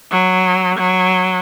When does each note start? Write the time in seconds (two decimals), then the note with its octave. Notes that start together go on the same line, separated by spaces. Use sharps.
0.11 F#3
0.78 F#3